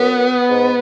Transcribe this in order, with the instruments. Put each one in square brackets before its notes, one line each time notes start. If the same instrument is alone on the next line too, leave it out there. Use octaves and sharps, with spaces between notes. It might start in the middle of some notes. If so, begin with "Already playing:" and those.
Already playing: [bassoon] F#2 [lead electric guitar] B3
[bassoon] G#2